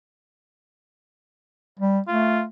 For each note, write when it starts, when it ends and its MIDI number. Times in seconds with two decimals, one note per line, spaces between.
1.79 1.99 55
2.08 2.47 57
2.08 2.42 65